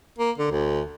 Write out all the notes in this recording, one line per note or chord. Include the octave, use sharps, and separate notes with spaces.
A#3
D3
D2